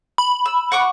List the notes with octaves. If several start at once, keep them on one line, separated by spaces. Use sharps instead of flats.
B5
E6
F#5 C#6 D6